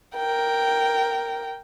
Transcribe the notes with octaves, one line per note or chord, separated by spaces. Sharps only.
A#4 G5